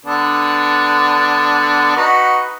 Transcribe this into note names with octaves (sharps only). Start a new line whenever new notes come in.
D3 B3 D4
D#4 F#4 B4